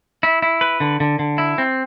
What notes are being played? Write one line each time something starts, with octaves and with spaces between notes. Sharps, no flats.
E4
E4
B4
D3
D3
D3
E4
C4